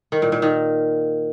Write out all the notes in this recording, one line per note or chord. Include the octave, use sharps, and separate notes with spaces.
D#3
A#2
A#2
D#3